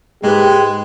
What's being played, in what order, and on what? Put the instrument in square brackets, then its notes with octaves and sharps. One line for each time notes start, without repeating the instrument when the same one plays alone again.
[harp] G#2 B4 [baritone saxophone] G#3 [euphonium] G4 [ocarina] G5